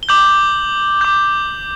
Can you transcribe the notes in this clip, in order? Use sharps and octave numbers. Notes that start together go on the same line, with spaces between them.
G7
D6 G6 F#7
D6 G6